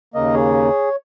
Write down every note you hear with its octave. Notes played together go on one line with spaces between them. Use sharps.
D#2 C#3 A#3 A#4 D#5
G#4 C#5